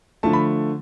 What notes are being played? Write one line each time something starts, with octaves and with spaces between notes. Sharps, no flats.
D3 F3 A3 A5
B5